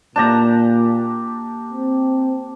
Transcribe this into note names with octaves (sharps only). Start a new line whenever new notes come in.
A#2 A#3 D4 G4 A5 A#5
C4